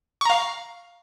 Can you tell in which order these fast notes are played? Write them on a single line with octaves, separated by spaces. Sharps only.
C#6 A#5 F5